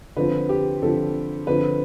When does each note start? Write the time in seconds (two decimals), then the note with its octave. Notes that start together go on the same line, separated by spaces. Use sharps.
0.16 D3 F3 C4 B4
0.49 G4
0.82 D3 F3 C4 A4
1.47 D3 F3 C4 B4